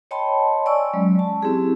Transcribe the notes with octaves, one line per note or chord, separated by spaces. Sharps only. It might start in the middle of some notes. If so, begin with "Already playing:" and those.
C#5 D#5 G5 A5 B5 C6
D5 G#5 C#6 E6
F#3 G#3 C#4
A5
C4 E4 G4 G#4